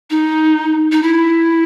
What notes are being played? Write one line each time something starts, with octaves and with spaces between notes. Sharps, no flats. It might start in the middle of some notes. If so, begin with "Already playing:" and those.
D#4
D#4
E4